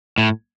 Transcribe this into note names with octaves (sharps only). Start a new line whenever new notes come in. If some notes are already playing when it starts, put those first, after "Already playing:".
A2